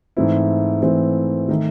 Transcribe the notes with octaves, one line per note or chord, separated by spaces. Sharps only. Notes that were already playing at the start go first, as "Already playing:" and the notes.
G#2 E3 A3 C4 E4
G#2 E3 A3 C4 E4
D#3 A3 D#4